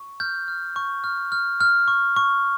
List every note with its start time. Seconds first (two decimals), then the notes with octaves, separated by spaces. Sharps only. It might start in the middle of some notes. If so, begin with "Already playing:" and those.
Already playing: C#6
0.20 F6 G6
0.48 F6
0.76 C#6
1.04 F6
1.32 F6
1.60 F6
1.88 C#6
2.16 C#6